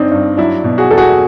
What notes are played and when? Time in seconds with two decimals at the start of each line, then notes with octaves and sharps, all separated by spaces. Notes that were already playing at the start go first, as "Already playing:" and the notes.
Already playing: G1 C4 D4 D#4
0.11 G2
0.37 F#3 D4 E4
0.64 B2
0.78 F#4 G#4
0.91 E2 A4
0.97 F#4 G#4